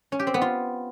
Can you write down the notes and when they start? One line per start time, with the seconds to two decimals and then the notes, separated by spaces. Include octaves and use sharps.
0.12 C#4
0.19 G4
0.27 C4
0.34 B3
0.42 F4